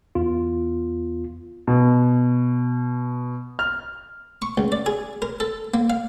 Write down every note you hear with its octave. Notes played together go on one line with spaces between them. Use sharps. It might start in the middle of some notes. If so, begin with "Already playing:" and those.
E2 B3 F4
B2
F6
C#6
C#2
D5
G#4
A#4
A4
A#3
F5